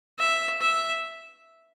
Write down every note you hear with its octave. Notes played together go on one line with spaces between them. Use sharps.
E5
E5